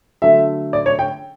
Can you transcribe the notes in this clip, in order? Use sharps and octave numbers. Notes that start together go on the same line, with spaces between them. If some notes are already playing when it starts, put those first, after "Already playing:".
D3 F#3 A3 E5
D5
C#5
G5